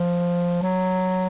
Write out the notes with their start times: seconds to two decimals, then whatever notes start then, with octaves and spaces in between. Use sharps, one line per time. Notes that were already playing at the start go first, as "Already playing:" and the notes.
Already playing: F3
0.62 F#3